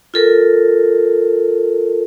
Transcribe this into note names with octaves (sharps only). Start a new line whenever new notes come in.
F4 A4 A#4